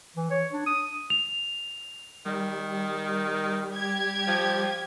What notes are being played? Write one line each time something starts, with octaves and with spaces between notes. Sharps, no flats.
E3
C#5
D4
D#6
F7
D#3 G3
G4 G#6
F3